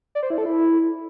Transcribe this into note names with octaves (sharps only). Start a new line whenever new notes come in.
D5
C5
E4
A4
E4